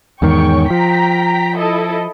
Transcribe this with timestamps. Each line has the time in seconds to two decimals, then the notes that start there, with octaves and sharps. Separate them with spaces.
0.22 E2 G#2 D#3 C#5 G5 C#6
0.70 F3 G5 A#5 B6
1.57 E4 A4 D#5